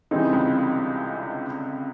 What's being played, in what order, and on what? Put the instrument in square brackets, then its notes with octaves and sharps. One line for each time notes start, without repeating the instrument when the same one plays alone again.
[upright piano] D3 [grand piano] E3 G3 C4 D#4 G#4
[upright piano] C#3
C3
C#2 C#3